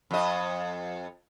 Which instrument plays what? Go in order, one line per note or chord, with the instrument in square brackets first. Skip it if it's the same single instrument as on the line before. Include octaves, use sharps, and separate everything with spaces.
[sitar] F2 D#5